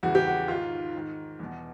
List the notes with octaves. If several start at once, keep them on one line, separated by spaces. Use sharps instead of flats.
E2 C#3 E3 F#4
G4
F#4
G#2 D#3 F4
G#2 D#3
E2 B2